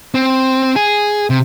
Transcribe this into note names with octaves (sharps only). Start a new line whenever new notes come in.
C4
G#4
C3